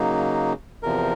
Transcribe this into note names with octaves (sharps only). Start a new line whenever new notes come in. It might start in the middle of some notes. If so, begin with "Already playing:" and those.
Already playing: C#3 F#3 A#3 D#4
E2 C3 F3 A#4